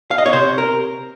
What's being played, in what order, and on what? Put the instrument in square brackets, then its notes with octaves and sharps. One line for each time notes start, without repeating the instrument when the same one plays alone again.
[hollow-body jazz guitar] F5
D#5
C#5
C3 C5
A#4